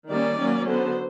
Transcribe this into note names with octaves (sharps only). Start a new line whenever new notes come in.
D#3 G3 A#3 C#4 D5
F#3 A#3 C#4
D3 F#3 B3 C5